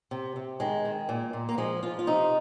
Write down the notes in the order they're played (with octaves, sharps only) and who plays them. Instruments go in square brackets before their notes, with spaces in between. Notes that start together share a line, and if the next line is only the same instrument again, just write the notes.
[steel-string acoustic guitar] C3
C3
D#3 G#3
D#3
A#2
A#2
A#3
F3 G#3
F3 F4
F4
C3 D#4